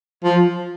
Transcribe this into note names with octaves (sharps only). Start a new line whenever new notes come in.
F3